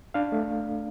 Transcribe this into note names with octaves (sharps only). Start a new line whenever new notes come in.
D4 F5
A3